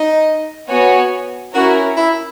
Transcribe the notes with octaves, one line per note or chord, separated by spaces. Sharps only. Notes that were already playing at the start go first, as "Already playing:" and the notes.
Already playing: D#4
B3 F#4 C#5 G#5
C#4 E4 F#4 A#4
E4